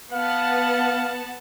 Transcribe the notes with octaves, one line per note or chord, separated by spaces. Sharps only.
B3 F5 F#5 A5